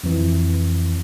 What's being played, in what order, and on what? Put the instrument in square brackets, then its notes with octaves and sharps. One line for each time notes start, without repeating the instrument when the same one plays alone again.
[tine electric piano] F2 E3